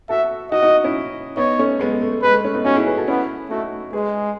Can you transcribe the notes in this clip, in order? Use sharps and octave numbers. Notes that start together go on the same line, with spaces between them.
F#4 A4 E5
D#4 F#4 D#5
D#4 F#4
C#4 E4
B3 D#4 C#5
A3 C#4
G#3 B3
A3
A3
A3
G#3 B4
A3
A3 C#4
B3 D#4
C#4 D#4 F#4
E4 G#4
G#4 B4
F#4 A4
B3 C#4 E4
A3 D#4 F#4
G#3 G#4 B4